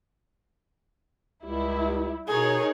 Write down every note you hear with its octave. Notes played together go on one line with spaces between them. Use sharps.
C#2 G3 E4
B2 D#4 G#4 A#4 C#5